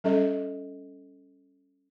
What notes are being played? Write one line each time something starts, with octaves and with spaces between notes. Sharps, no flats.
G3 C#4 A4 D#5